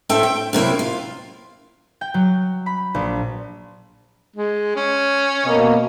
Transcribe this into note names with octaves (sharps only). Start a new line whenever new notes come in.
A2 C4 A4 E5 G5
G5
F#2 C3 A#3 E4
F4
G5
F#3
B5
A#1
G#3
C#4
B2 A#3 D#5